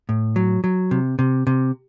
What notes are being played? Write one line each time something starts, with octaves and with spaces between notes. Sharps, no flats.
A2
F#3
F#3
C3
C3
C3